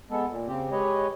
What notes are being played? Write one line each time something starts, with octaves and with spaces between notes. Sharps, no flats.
G#3 B3 A4
A#2
C#3 C4 G4
G#3 G4 B4 C#5 D#5